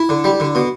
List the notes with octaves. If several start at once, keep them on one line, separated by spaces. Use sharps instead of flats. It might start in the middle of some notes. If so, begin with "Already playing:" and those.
Already playing: E4
D3
G3
D3
B2